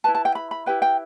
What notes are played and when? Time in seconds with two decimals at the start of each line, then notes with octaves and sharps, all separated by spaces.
0.04 E4 B4 A5
0.15 A5
0.25 G5
0.35 B5
0.51 B5
0.66 E4 G4 B4 G5
0.82 G5